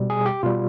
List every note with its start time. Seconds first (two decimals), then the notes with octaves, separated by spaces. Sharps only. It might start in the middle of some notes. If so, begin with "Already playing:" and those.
Already playing: B2 G3
0.10 G#4
0.26 G4
0.43 B2 G3 F4